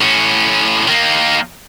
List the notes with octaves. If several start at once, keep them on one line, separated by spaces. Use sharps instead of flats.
A2 C#4
D#3 A#3